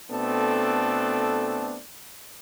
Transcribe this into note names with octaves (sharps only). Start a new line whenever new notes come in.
B2 A3 B3 C4 D4 A4